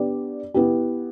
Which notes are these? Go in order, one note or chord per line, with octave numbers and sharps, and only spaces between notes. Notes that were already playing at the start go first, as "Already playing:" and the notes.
Already playing: B3 D4 G4 D5
B3 E4 G4